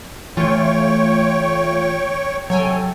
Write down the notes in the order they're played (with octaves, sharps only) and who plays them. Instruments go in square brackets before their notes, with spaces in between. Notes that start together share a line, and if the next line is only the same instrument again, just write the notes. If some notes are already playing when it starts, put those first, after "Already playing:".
[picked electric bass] E3 [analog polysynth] A3 F4 [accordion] C#5 G5 C#6
[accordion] C3 A4 [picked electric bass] F#3 [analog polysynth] C#5 G5 G#5